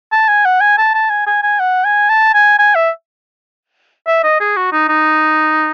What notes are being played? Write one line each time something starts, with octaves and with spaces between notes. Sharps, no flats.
A5
G#5
F#5
G#5
A5
A5
G#5
G#5
G#5
F#5
G#5
A5
G#5
G#5
E5
E5
D#5
G#4
F#4
D#4
D#4